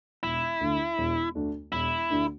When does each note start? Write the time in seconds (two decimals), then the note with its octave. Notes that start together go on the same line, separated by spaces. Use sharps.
0.23 E1 E4
0.61 D2 D3 A3 D4
0.98 E1
1.35 D2 D3 A3 D4
1.72 E1 E4
2.10 D2 D3 A3 D4